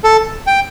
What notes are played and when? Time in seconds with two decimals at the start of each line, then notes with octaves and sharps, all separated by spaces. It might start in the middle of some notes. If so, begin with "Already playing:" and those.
0.04 A4
0.47 G5